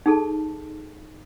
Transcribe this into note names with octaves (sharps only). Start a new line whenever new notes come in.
D#4 G#4 A4 A5